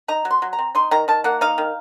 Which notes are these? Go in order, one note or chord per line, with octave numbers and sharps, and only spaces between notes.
D#4 A#5
F#3
C6
F#3
A#5
C4
D#4 C6
D#3 A#5
D#3 A5
A#3 F#5
D#4 F5
D#3